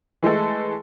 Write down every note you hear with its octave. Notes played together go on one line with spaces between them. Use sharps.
E3 G#3 A3 A4